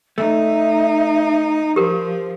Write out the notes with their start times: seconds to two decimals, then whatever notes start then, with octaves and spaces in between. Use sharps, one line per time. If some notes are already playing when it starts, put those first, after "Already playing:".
0.18 A3 D#4 E5
1.76 F3 G4 A#4 C5